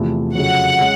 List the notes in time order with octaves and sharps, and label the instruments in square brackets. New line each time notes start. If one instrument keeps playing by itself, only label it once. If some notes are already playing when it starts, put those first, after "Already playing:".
Already playing: [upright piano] E2 C3 F3 A3
[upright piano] F2 C#3 F#3 [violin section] F#5
[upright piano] G#3 C#4